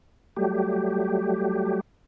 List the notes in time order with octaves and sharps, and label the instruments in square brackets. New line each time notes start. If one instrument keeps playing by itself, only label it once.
[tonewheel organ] F#3 G3 A3 G4